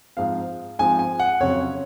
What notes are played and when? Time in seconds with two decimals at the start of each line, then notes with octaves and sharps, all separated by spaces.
0.17 G#2 F3 C4 F5
0.79 G#2 F3 C4 G#5
0.99 G#5
1.20 F#5
1.40 F2 C#3 F#3 C#5